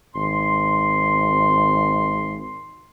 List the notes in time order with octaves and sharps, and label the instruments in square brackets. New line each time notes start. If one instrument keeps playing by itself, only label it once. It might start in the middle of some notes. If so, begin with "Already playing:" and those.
[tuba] G#1 [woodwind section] C6